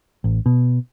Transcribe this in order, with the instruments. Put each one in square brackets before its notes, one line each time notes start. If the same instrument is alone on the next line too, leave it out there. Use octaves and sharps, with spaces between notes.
[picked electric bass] A1
B2